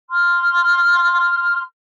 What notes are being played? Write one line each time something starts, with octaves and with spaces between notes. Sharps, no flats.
C6 F6